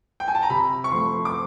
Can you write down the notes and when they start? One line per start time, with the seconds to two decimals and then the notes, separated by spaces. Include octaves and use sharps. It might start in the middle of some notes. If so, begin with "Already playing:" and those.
0.20 G5
0.28 G#5
0.35 A5
0.43 A#5
0.50 C3 B5
0.84 C#6
0.91 F3 A3 C6
1.25 D6